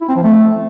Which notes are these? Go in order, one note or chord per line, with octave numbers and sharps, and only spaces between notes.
E4
C4
F3
A3